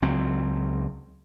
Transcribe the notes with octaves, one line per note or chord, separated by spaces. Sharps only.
C#2 F#3 C4